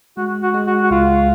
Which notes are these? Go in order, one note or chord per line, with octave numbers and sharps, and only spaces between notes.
G#3 F#4
F#4
G#3
F#4
F#4
C#2 F4